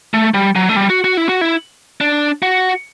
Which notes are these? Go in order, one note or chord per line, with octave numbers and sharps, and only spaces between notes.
A3
G3
F#3
A3
G3
F#4
F#4
E4
F#4
E4
D4
F#4